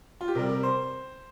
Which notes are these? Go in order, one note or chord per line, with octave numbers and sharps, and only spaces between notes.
F4
G4
C3 G3 A#4
A#4
C5